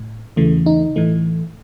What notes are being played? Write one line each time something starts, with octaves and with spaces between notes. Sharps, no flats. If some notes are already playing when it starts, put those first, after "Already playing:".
Already playing: A2
E2 C#3 E3 A3
D#4
A2 E3 A3